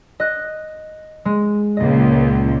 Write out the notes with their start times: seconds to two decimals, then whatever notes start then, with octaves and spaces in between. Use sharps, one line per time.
0.20 D#5 F#6
1.25 G#3
1.77 C#2 A#2 D#5